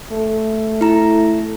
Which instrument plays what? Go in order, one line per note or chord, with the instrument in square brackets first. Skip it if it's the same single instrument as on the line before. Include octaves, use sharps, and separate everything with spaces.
[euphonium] A3
[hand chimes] E4 A#5